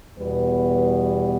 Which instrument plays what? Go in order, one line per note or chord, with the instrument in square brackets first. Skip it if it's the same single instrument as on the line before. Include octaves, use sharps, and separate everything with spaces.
[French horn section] E2 B2 G3 B4